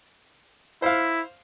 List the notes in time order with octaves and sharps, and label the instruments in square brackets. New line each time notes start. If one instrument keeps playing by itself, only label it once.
[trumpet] E4 [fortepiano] C5 F5